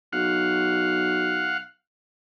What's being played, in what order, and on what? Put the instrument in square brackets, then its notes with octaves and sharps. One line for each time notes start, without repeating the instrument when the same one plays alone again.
[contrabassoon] B1 [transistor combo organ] F5 F#5